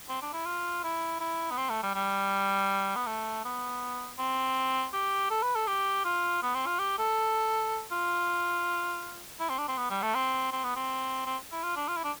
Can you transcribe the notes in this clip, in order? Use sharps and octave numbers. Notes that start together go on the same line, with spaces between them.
C4
D4
E4
F4
E4
E4
B3
C4
A3
G3
G3
B3
A3
B3
C4
G4
A4
B4
A4
G4
F4
B3
C4
F4
G4
A4
F4
E4
C4
D4
C4
B3
G3
A3
C4
C4
B3
C4
C4
E4
F4
D4
F4
E4
D4